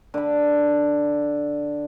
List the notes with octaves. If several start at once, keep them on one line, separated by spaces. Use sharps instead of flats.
D3 B5